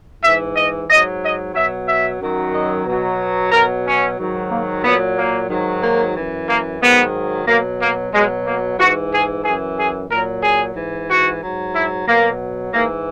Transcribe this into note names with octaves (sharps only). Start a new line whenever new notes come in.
G#2 E3 E5
D#5
G#2 F#3 D#5
D#5
B2 F#3 E5
E5
F#2 D#3 F#3
D#5
B2 F#3
B2 F#3 A#4
C#4
G#2 D#3 F#3
A#3
A#2 F#3 B3
A#3
G#2 D#3 F#3
A#3
F#2 E3
A#3
G#2 D#3 F#3 B3
B2 F#3 A#3
A#3
B2 F#3 G#3
A#3
G#2 E3 F#4
G#4
F#2 E3 G#4
G#4
A#2 F#3 A#4
G#4
G#2 E3
F#4
G#2 F#3
E4
B2 F#3 A#3
G#2 E3 A#3